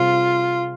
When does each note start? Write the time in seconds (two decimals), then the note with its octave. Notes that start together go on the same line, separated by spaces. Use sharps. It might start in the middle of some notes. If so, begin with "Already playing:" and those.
Already playing: C3 G3 C4 F4 G#4